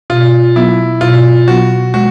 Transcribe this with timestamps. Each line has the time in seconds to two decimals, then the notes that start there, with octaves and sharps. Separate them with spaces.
0.10 B2 F4
0.56 F#3 B3 E4
1.01 B2 F4
1.48 F#3 B3 F#4
1.94 G#3 F#4